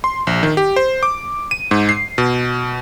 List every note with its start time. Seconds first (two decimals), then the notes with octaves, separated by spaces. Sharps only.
0.04 C6
0.27 A#1
0.43 D#3
0.57 G4
0.76 C5
1.03 D6
1.51 D#7
1.71 G#2
1.89 C7
2.18 B2